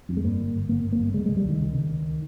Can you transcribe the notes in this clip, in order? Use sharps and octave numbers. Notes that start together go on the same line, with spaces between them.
F2
G#3
G2 A#3
G1
G1
G1 A#3
G1
A#3
G2
C#2 G#3
G#3
C#2
G3
C#2 D#3
C#3
C#3
C#2